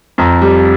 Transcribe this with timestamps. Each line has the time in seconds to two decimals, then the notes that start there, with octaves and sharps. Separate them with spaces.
0.18 F2 A#5
0.42 G3